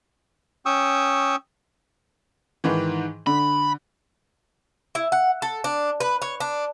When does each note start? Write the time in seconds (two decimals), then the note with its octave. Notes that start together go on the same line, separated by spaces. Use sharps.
0.66 C#4 G5 C#6 D#6 E6
2.64 G#2 D#3 E3
3.27 D3 B5
4.95 E4
5.12 F#5
5.42 A4
5.64 D4
6.00 B4
6.22 C#5
6.40 D4